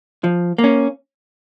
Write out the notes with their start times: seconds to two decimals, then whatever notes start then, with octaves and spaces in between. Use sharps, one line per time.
0.24 F3
0.58 A#3
0.64 C#4